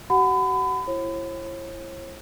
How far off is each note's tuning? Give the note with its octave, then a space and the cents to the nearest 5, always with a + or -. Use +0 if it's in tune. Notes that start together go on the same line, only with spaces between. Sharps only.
F#4 +40 F#5 +0 B5 +30
E4 +35 C#5 -45